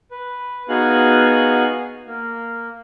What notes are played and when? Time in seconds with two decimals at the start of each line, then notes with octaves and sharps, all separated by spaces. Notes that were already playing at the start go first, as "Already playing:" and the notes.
0.11 B4
0.69 B3 D#4 F#4 G#4 F5 F#5
2.07 A#3